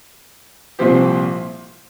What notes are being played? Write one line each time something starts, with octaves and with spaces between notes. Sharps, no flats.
C2 A#2 F3 C4 G4